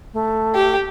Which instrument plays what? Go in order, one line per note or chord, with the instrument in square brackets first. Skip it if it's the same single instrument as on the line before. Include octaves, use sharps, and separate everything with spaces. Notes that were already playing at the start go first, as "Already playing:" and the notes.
[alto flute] A3
[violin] G4